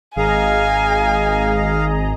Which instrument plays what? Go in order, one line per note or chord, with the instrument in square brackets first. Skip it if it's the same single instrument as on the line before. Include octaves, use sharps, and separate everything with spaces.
[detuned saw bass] G#1 [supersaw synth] G#4 D#5 A#5 [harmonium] F5 [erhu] G#5